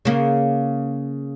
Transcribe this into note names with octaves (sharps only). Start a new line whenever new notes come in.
C#3 A#3